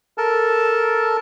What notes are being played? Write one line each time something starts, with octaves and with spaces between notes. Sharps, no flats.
A4 A#4 A5